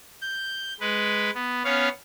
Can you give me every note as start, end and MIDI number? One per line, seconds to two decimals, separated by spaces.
0.21 0.74 91
0.80 1.31 56
0.80 1.31 71
1.35 1.64 59
1.65 1.89 59
1.65 1.89 61
1.65 1.89 73
1.65 1.89 77